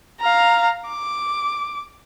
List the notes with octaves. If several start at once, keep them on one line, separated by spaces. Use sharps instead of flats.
F5 A#5
D6